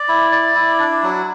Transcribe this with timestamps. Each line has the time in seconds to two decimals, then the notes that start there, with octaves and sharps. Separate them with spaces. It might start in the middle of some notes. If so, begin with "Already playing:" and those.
Already playing: D5
0.09 E4
0.32 D5
0.55 E4
0.79 D4
1.03 F#3